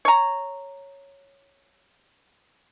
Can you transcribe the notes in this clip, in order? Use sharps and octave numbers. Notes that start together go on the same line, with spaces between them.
C#5 A#5